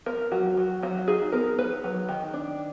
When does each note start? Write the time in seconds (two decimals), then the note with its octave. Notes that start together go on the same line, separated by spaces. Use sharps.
0.06 B3 A#4
0.32 F#3 F#4
0.58 F#3
0.83 F#3 F#4
1.08 D#4 G#4
1.32 B3 A#4
1.58 B3 B4
1.84 F#3
2.09 D#3
2.33 D4